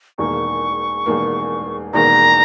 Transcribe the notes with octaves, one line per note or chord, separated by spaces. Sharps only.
E1 E2 D#3 A#3 C#6
E1 E2 D#3 A#3
E1 E2 D#3 A#3 A#5